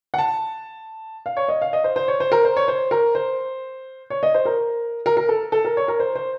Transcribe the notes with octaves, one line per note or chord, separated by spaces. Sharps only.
F#5
A5
F5
C#5
D#5
F5
D#5
C5
C5
C#5
C5
A#4
C5
C#5
C5
A#4
C5
C#5
D#5
C5
A#4
A#4
A#4
A4
A4
A#4
C#5
A#4
C5
C5